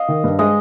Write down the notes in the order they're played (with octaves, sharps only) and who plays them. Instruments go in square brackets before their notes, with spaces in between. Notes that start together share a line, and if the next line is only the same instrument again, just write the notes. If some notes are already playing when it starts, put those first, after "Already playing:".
Already playing: [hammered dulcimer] D#5 F5
[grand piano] D#3
G2
[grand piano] G#3 [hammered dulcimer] D#5